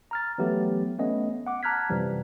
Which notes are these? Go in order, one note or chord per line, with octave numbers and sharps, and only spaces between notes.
A#5 F6 A6
E3 F#3 A3 B3 G4
A3 B3 C#4 D#5
F#5 D6
A5 A#5 F6 F#6 G#6 B6
F#2 C3 E3 F3 G3